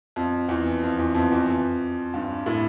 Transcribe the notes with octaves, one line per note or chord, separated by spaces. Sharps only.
F2
E2
F2
E2
F2
E2
F2
G2
A2